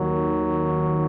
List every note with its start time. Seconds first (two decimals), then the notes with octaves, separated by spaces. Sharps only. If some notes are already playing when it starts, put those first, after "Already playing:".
Already playing: D#2 D#3 F#3